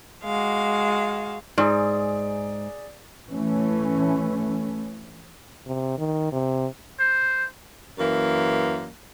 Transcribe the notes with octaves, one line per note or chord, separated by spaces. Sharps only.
G#3 F#4 F5
G#2 G#4 D5
E3 A3 C#4
C3
D#3
C3
C5
F#2 E3 A#3